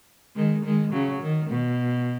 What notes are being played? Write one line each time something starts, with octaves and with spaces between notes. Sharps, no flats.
D#3 G#3
D#3 G#3
C#3 F#3
D#3
B2